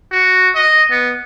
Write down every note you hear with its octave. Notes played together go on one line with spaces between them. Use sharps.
F#4
D#5
B3